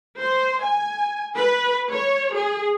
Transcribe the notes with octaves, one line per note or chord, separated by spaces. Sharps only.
C5
G#5
B4
C#5
G#4